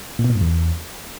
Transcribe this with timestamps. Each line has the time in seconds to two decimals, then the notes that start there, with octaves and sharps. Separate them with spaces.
0.19 A#2
0.24 B2
0.30 A#2
0.35 G2
0.41 E2